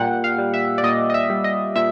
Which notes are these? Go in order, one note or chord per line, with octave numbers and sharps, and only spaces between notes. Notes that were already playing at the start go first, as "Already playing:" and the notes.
Already playing: A#2 G3 F#5 G5
F5
G3
E5
D5
A#2 D#5
D#5
E5
G3
D#5
A#2 E5